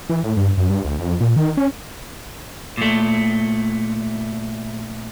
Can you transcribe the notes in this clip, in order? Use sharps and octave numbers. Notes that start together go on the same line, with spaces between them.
E3
A2
G2
F#2
G2
D2
F2
A#2
D#3
C#4
A#2 A3